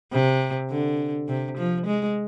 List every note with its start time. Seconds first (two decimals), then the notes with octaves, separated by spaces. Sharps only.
0.12 C3
0.70 D3
1.28 C3
1.58 F3
1.86 G#3